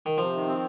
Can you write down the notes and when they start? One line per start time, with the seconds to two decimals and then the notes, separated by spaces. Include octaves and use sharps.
0.06 D#3
0.17 C3 F3
0.33 D#3
0.47 C4